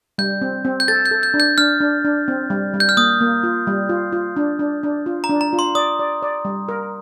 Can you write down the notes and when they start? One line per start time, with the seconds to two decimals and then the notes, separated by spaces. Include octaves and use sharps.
0.18 G3 G6
0.41 C4
0.65 C4
0.80 G6
0.88 A4 A6
1.06 G6
1.11 A4
1.23 G6
1.34 D4
1.40 G6
1.58 D4 F6
1.80 D4
2.05 D4
2.28 C4
2.50 G3
2.74 G3
2.80 G6
2.89 F6
2.97 A#3 D#6
3.21 A#3
3.43 F4
3.67 G3
3.89 F4
4.12 F4
4.37 D4
4.59 D4
4.83 D4
5.06 F4
5.24 A#5
5.29 D4
5.41 A#5
5.53 F4
5.59 C6
5.75 D5 D#6
5.99 D5
6.22 D5
6.45 G3
6.69 A#4